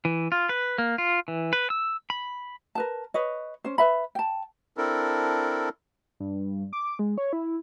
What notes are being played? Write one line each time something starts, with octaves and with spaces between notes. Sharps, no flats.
E3
F4
B4
A#3
F4
E3
B4
E6
B5
A#4 B4 A5
B4 C#5 D#5
C#4 C5
B4 E5 B5
G5 A5
C4 D4 E4 A4 A#4
G2
D6
G#3
C#5
E4